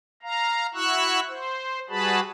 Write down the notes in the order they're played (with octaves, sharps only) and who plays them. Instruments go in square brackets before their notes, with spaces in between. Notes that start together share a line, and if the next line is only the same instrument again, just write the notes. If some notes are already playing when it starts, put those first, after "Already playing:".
[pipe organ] F5 A#5
E4 F#4 C#6 E6 F#6
C5
G3 F#4 G#4 B4 A5 B5